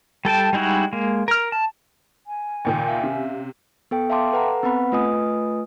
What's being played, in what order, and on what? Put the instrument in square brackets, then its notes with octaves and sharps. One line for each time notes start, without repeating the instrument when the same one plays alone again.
[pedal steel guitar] G3 A4 G5 A5
G3 G#3 D#4 E4 F#4
G#3 A#3
A#4 F6
A5
[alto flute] G#5
[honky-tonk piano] C#2 A#2 D#3 [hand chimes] G5
[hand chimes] E5 F5
[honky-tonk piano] C3 [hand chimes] C#4
[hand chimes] B3 A4 G5
E5 F5 G5 A5 C6 D6
A4 B4 F#5 A#5
B3 C4 B4 F#5 B5
A3 F4 B4 D#5 G#5 D#6